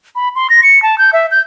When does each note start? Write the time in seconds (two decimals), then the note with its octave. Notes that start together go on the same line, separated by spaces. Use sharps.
0.15 B5
0.35 C6
0.50 A#6
0.63 C#7
0.82 A5
0.98 G6
1.13 E5
1.31 G6